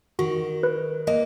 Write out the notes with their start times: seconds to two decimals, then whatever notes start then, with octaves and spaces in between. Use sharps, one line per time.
0.19 D#3 F#4
0.63 B4
1.07 A#3 D#5